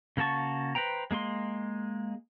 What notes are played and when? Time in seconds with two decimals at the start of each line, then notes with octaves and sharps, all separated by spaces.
0.17 C#3 A#3 F#4 A5 C#6
0.75 B4 C5 G5 A#5
1.11 G#3 A#3 G#4 C6